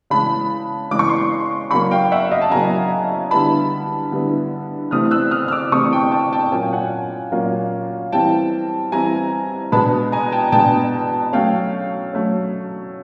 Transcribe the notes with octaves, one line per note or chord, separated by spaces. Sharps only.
C#3 E3 G#3 A5 B5
C#3 E3 G#3 D6
C#6
C6 D6
C#3 F#3 A#3 B5 C#6
F5 G5
E5 F#5
D#5 F5
A5
C#3 F#3 A#3 G#5 A#5
D3 G3 B3 E4 A5 B5
D3 G3 B3 E4
C3 E3 A3 C4 E4 D#6 F6
E6 F#6
D#6 F6
F6
D6 E6
C3 E3 A3 C4 E4 C#6 D#6
G5 A5
G5 A5
G5 A5
A#2 F#3 A#3 C#4 F4 G#5
G5
F#5 G#5
A#2 F#3 A#3 C#4 F4
E3 G3 C4 E4 G5 A5
E3 G3 C4 E4 G#5 A#5
B2 G#3 B3 D4 A5 B5
G#5 A#5
G5 A5
B2 G#3 B3 D4 G5 A5
F#3 A3 C#4 F5 G5
F#3 A3 C#4